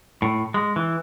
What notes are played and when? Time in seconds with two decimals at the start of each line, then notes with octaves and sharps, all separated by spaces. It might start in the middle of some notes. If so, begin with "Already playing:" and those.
0.22 A2
0.54 G#3
0.76 E3